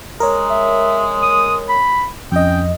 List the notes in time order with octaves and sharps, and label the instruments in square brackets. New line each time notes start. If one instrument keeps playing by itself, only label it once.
[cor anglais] G#3 [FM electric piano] A#4 C#5
[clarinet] E5
D#6
B5
[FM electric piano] F2 D#5 [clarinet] C#4 [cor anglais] G5